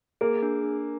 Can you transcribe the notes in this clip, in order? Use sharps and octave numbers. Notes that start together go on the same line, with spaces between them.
A#3 G#4
D4
D4